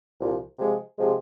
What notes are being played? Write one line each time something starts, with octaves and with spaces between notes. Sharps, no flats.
C2 A#2 F3
C3 F3 G#3
C3 F3 G#3